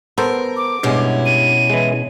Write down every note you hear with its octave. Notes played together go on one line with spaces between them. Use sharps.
B3 A4 A#4 C5
D6
G2 B2 G#3 C#4 E4
D#7
E3 G#3